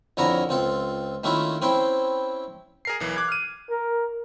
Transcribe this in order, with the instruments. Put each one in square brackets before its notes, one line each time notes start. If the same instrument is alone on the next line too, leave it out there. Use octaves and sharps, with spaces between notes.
[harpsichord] F2 D3 E4 A#4 C#5 A#5
C#2 C4 F4 A4
D#3 A3 A#3 C#4 E4 F4
C4 C#4 E4 C5 G5
[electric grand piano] G#4 A#4 C7
B1 E3
D6 F#6 G#6
F6 D#7
[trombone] A#4